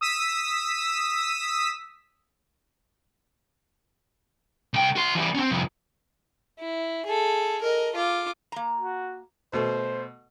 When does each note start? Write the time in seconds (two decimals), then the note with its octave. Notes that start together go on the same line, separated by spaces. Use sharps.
0.01 D#6 E6 B6
4.74 C2 G5
4.96 F#4 C6
5.15 E3 G3
5.35 C4 C#4
5.50 C2 F2
6.60 E4
7.06 G#4 A4
7.61 A#4 D#5
7.95 F4 D6
8.52 A#3 A#5
8.77 F#4
9.53 B2 A3 C5